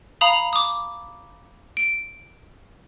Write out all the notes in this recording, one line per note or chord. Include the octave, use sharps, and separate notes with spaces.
F5 A#5 B5 D#6 F7
D6 D#6
D7